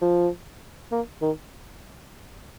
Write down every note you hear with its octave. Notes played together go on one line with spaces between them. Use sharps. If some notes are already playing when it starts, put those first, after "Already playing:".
F3
A#3
D#3